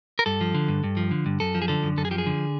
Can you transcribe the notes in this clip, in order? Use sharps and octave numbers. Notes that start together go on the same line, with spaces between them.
A#4
G2 A4
F3
D3
G2
G2
F3
D3
G2
F#2 A4
F3
G#4
D3 A4
F#2
F#2 A4
G#4
F3 G4
G#4
D3